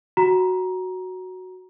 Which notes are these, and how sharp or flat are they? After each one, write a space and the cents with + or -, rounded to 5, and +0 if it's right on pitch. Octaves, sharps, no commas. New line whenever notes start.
F#4 +0 A#5 +15